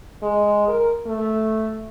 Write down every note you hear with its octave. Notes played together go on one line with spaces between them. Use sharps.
G#3
A#4
A3